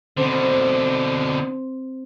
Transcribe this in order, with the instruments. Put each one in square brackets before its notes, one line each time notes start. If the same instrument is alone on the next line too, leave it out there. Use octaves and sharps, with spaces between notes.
[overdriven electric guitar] B2 D3 [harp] C4